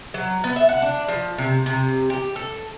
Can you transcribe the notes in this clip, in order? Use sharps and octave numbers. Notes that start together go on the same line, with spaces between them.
F#3
B3
E5
F#5
D4
F3
C3
C3
G4
A4